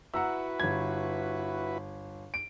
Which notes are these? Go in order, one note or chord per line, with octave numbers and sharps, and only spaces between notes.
E4 F#4 B4 F#5 A#5 E6
G1 G#6
D7